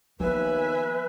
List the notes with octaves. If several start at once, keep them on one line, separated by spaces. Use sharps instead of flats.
D#2 F3 B3 B4 E5 G#5